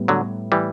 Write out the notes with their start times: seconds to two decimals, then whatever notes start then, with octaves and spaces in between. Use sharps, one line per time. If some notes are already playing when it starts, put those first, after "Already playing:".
Already playing: A2 G3 B3
0.08 D3 F#3
0.52 E3 G3